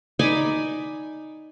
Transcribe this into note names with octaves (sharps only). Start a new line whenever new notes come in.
D#4 D5 G#5 B5